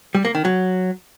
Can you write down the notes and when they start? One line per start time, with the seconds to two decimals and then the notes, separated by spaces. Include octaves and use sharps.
0.15 G3
0.25 A#3
0.35 D#3
0.45 F#3